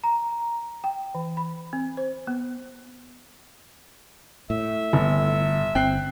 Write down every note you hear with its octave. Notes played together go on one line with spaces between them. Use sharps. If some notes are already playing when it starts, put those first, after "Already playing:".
A#5
G5
E3
B5
C4
C5
B3
A2 E5
G1
G1 C4 G5 F#6 C7